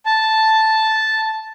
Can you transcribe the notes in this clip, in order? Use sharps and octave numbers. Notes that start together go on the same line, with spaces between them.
A5